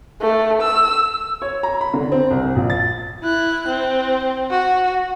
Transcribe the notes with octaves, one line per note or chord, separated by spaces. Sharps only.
A3
E6
C#5
A#5
B5
D3
C4
C2
A#1
A6
E4 F#6
C4
F#4